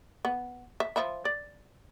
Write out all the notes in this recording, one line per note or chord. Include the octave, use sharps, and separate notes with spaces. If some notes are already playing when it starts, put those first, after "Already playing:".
B3
E5
F3 E5 B5
D5